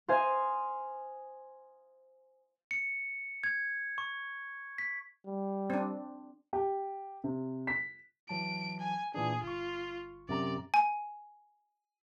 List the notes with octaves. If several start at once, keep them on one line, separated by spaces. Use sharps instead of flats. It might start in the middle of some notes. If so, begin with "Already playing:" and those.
C5 D#5 F5 G#5
C#7
G#6
C#6
B6
G3
C4 D4
G4
C3
B6
E3 F#3 A5 D7
G#5
A#2 E3 D4 G#4
G1 F4 C#6
F#2 C3 D5 A#5
G#5